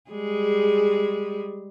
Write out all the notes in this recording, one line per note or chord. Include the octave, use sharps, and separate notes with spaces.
G3 G#3 G#4